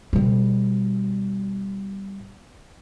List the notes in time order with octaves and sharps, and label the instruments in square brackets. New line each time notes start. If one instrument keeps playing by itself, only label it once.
[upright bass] B2 G3